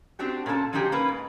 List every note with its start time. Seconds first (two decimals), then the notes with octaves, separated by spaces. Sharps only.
0.19 C4 D4 F#4 G4
0.46 A#2 C#4 A4 A#4 A5
0.73 F3 F#3 D4 D#4 G4 G#4
0.92 A#3 C#4 B4
1.08 G#2